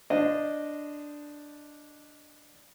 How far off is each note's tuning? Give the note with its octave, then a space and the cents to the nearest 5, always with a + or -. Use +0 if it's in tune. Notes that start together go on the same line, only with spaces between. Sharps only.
D4 +0 C5 -20 D#5 -10